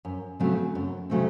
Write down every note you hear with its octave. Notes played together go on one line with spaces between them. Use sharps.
F#2
C#3 F#3 A3 C4
F#2
C#3 F#3 A3 C4